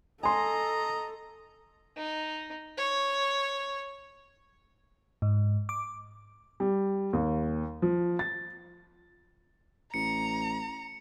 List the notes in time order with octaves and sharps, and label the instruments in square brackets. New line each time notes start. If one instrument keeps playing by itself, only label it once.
[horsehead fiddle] A4 [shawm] D#5 [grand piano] G#5 C6 [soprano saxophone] A#5
[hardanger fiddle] D#4
C#5
[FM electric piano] G#2
D6
[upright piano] G3
D#2
F3
A6
[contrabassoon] A1 [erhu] A#5 [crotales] C#7